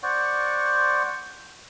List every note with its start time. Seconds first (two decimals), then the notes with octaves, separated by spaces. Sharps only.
0.03 C5 D5 F#5 C#6